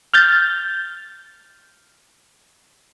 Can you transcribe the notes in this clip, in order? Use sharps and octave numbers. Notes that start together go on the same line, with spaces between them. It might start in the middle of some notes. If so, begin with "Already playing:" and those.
F6 G6 A6